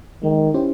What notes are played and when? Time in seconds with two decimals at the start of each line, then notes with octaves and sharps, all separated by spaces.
0.23 D#3 G#3
0.54 C#4 E4 G4 C5